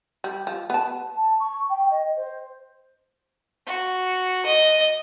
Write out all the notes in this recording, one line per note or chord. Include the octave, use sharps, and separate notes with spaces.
G3
F3
B3 A5
A5
C#6
G5
D#5
C5
F#4
D#5